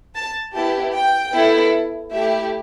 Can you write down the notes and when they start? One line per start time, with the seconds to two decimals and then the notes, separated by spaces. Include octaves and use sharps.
0.15 A5
0.54 B3 E4 G4 A5
0.94 G5
1.33 B3 E4 A4
2.12 A3 E4 G4 E5